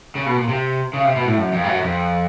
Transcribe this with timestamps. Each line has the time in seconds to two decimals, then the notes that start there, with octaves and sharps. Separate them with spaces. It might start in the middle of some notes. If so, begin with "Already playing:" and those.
0.15 C#3
0.26 B2
0.37 A#2
0.49 C3
0.93 C#3
1.04 C3
1.16 B2
1.27 A2
1.38 F#2
1.53 F2
1.64 G2
1.67 F#2
1.83 F2